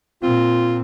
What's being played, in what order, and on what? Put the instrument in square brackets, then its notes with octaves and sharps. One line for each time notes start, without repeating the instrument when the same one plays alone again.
[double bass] A#2 C4 [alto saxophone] F4